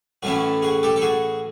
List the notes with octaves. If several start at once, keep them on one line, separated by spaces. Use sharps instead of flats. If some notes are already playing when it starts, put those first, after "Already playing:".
A2 E3 A3 C#4 E4 F#4
F#4 G#4
G4 A4
A4
F#4 G#4